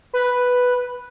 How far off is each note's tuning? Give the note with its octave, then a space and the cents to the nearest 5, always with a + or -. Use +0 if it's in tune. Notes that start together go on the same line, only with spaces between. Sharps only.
B4 +0